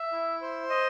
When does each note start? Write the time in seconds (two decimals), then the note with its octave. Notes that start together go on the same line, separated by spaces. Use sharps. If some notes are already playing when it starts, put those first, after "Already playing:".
Already playing: E5
0.12 E4
0.41 C5
0.70 D#5